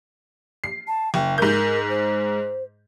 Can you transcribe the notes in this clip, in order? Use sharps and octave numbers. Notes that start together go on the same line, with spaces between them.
C7
A5
F#1 G5
G#2 A#4 G6
C5